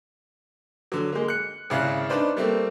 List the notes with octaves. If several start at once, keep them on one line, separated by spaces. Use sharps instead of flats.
D3 F#3
G#3 A#3
F#6 C#7
G#1 C#3 E4 F5 F#6
D4 D#4 B4 C5 D5
G3 A3 A#3 C4